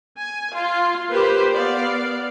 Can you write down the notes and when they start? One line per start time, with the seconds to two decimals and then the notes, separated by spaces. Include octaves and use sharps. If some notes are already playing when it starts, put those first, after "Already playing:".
0.17 G#5
0.53 F4
1.09 A#3 G4 B4 C5
1.55 B3 D5 F5